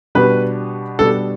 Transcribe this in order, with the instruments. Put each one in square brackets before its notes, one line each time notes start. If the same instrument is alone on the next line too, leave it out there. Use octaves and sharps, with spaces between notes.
[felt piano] B2 G3 B3 D4 G4 [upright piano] B4
[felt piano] B2 G3 B3 D4 G4 [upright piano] A4